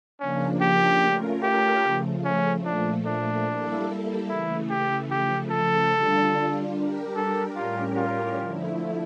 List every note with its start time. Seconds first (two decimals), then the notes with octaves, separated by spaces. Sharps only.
0.20 C#3 F3 A#3 C#4 D4
0.60 G4
1.01 A3 C#4 F4 A#4
1.43 G4
1.83 C#3 F3 A3
2.24 C#4
2.65 A#2 F3 A3 D4
3.06 D4
3.47 G3 A#3 E4 A4
4.29 C#3 E3 A3 E4
4.70 G4
5.10 C#3 F3 A3 G4
5.51 A4
5.92 D3 G3 D4 F4
6.74 G3 D4 G4 A#4
7.15 A4
7.55 A2 G3 C#4 F4 G4 A#4
7.96 F4
8.38 D3 F3 A3 E4